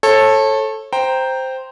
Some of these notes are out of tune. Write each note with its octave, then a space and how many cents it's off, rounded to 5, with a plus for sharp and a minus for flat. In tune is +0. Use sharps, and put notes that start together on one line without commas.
A4 +0 C#5 -30
C5 -5 G5 +0 A#5 +0